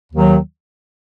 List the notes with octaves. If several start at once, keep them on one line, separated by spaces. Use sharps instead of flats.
D#2 D#3 F#3